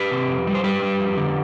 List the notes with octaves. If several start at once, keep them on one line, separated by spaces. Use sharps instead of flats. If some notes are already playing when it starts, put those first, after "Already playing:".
Already playing: G4 B4
C3
F2
G3
C5
G3 G4 B4
G3
F2
D3